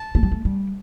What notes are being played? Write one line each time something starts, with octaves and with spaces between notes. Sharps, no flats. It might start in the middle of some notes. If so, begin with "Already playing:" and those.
Already playing: A5
A3
G3
A3
G3